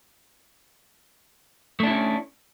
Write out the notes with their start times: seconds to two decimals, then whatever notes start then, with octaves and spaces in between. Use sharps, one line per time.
1.80 A3
1.83 D4
1.87 E4
1.91 C#4